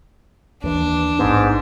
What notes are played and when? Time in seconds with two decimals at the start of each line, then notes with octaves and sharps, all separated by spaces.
0.63 D#2 E3 D4
1.19 A1 G#2 B3